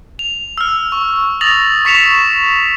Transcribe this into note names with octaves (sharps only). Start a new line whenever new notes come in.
F7
E6 F6
C#6
D#6 A6 A#6 F7 F#7
C#6 B6 C#7 E7 F7